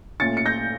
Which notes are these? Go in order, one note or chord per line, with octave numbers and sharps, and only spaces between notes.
A#2 A3 C#4 A6 C#7
C#7
G6 A#6